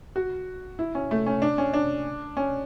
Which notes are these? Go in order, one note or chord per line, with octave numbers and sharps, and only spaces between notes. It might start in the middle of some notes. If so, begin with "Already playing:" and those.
F#4
E4
C#4
A3
C#4
D4
C#4
D4
C#4